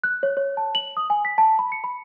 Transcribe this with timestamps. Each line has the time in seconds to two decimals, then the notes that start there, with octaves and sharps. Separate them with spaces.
0.04 F#6
0.23 C#5
0.37 C#5
0.57 A5
0.75 F#7
0.97 D#6
1.10 G#5
1.25 B6
1.38 A5
1.59 B5
1.72 C#7
1.84 B5